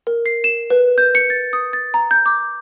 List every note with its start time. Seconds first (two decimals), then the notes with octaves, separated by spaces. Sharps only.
0.07 A#4
0.26 C7
0.44 E7
0.70 B4
0.98 G6
1.15 C#7
1.30 A6
1.53 D#6
1.73 A6
1.94 A#5
2.11 G6
2.26 D6